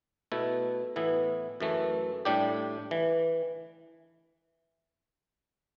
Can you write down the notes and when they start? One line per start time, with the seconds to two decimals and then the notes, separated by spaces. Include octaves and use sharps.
0.32 B2 A3 E4
0.96 A2 E3 B3 E4
1.60 F#2 E3 A3
2.25 A2 G3 D4 G4
2.91 E3